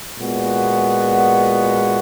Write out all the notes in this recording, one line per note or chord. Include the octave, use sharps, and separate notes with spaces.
A#2 G#3 B3 F#4